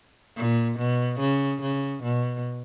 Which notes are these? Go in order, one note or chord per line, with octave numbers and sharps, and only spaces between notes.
A#2
B2
C#3
C#3
B2